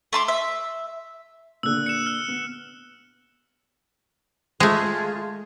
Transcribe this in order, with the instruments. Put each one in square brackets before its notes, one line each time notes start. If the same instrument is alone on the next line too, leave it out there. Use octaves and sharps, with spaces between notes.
[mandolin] A3 C6 D6
E5
[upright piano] A#2 D3 [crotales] E6 F#6
[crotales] C#7 E7
F6
[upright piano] B3
[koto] G#3 A3 [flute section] F4 G#4